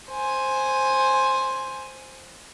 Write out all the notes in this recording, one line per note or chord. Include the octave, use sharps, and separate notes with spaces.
C5 G#5